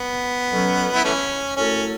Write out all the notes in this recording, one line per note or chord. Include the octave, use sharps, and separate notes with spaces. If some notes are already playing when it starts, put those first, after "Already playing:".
Already playing: B3
B2 F#3 C#4 A4
E4
E3 A3 C#4
F#2 F#3 A3 C#4 E4 A4